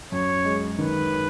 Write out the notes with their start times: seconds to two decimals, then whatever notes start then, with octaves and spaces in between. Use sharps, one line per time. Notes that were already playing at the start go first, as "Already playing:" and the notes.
0.12 F#2 C#5
0.45 G#3
0.78 D#3 B4